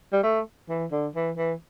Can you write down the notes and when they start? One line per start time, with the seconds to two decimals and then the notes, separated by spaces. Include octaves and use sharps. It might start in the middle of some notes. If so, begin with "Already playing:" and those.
0.13 G3
0.23 A3
0.69 E3
0.91 D3
1.15 E3
1.37 E3